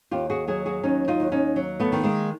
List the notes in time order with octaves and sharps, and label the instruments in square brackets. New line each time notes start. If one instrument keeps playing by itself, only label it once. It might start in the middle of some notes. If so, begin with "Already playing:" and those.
[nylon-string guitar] D#2 F4 G4
F#4 G#4
F#3 F#4 G#4
F#4 G#4
D#2 C#4 D#4
D#4 F4
D#2
C#4 D#4
F#3
A3 B3
D#3
G#3 A#3